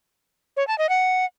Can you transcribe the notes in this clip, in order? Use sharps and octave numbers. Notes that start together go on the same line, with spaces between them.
C#5
A5
D#5
F#5